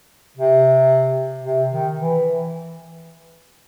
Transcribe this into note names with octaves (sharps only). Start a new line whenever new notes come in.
C3
C3
D#3
E3